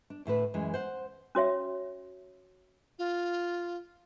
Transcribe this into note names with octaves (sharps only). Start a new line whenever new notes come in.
D4
D2 A2 A3 B4
F#2 E3 G#3
C5 F#5
C#4 F#4 C#5 E5
F4